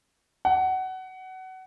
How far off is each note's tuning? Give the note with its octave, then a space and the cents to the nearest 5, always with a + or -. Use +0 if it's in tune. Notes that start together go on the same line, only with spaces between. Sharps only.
F#5 +20